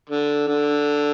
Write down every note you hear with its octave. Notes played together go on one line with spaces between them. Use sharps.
D3
D3